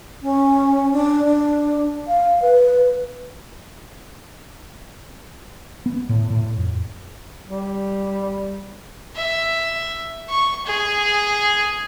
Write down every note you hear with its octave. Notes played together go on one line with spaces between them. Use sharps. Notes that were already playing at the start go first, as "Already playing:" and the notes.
C#4
D4
D4
F5
B4
B3
A2
A2
F2
G3
E5
C#6
G#4